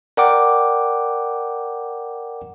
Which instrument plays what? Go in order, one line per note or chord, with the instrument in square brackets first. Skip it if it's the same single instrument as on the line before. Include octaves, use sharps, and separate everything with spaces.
[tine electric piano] A#4 D5 F#5 G5 D6